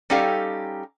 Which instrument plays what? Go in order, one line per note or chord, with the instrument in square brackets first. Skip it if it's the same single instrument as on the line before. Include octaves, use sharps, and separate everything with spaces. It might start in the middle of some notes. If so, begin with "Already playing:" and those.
[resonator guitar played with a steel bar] G3 C#4 D#4 G4 A4 F5